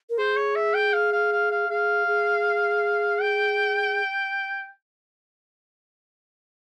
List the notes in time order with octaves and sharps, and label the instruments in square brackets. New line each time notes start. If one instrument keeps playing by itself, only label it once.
[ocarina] A#4
[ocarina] G#4 [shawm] C5
[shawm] C#5
E5
G5
F5
F5
F5
F5
[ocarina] G#4 [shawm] F5
[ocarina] G#4
[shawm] G5